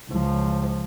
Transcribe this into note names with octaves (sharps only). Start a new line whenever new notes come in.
C#2 F3